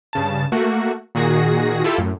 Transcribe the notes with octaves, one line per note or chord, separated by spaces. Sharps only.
G2 C#3 A5
A3 A#3 F#4
A#2 D#3 F#4 G#4 A#6
E4 F4 G4 A4
F#2 A2